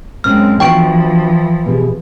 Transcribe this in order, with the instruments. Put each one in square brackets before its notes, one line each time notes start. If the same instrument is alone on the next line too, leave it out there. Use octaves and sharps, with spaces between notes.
[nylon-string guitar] F#2 C3 C#4 [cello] G#3 C4 [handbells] F6
[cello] E3 F3 [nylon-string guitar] B3 D4 F#4 [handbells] G5 C#6 D7
[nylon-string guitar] B2 G4 G#4